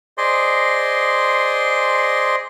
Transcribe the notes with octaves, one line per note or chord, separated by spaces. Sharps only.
G#4 C5 D5 D#5 C6